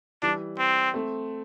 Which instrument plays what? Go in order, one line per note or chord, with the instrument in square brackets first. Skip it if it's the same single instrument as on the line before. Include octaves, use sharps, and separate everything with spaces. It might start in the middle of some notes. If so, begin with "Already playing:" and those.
[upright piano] E3 G3 [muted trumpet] D4
[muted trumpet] C4
[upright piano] A3 C4